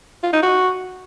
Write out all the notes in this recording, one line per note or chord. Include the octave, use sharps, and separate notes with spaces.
F4
D#4
F#4